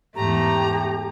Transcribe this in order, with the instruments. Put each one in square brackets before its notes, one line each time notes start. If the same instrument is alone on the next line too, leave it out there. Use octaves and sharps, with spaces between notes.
[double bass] E2 G#2 [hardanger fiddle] A3 [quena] G4 [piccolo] A#5